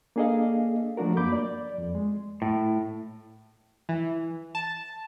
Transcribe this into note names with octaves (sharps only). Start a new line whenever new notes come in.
A#3 D4 G#4 A4 D#5 F5
F3 A3 D4 F#4 A#4
F#2 A#3 B5 D6 G6
D5
F2
G#3
A2
E3
A5